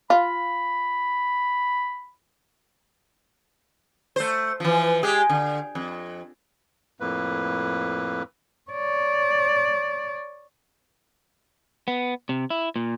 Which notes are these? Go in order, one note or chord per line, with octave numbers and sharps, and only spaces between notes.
F4 B5
A3 C5
E3 F3
G#3 G4 G#4
D3
F2
F2 A2 A#3 B4
C#5 D5
B3
C3
E4
A#2